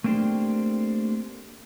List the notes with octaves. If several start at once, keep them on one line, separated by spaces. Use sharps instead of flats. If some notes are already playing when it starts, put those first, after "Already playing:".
A3 A#3 C4 D4 G4 C5